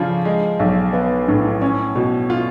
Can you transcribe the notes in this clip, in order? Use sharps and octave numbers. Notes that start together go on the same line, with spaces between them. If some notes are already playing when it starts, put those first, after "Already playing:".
Already playing: C#3 F3 D4
G#3
B1
B3
A2
C#4
B2
F4